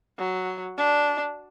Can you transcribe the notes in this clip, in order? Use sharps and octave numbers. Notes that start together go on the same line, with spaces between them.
F#3
D4